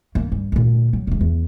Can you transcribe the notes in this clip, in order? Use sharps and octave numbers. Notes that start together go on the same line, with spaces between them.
D#3 A#3
G2
D2 A#2
F#3
E1 G#3
E2